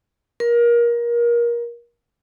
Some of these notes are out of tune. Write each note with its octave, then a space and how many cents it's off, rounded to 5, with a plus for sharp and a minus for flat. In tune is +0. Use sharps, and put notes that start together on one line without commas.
A#4 +25